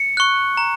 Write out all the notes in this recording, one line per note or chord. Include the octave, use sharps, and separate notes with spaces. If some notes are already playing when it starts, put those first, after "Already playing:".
Already playing: C#7
C#6 F#6
A#5